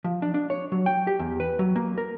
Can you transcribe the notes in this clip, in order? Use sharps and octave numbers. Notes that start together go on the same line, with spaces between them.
F3
D4
D4
C#5
F#3
G5
G4
E2
B4
F#3
A#3
A#4